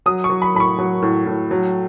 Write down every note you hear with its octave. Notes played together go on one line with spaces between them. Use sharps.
F#3 D#6
C#6
F#3
B5
A2 B5
C#6
F#3
A2
A2
F#3